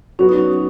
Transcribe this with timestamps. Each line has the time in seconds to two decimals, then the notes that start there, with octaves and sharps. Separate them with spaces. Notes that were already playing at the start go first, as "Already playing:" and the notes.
0.19 F#3 B3 C#4 F#4
0.29 D#4
0.38 C#4